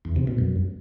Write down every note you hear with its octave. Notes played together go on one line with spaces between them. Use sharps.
E2
C3
B2
F#2